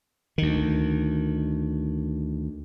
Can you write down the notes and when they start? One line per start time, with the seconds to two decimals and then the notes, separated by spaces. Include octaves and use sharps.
0.38 D2 D#3